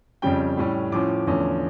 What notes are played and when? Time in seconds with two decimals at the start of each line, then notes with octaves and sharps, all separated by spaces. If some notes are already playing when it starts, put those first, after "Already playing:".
0.22 F2 C#3 G3 C#4 G5
0.57 A2 G3 C#4
0.92 A2 F3 C#4 D6
1.27 E2 D3 F3 A3 C#4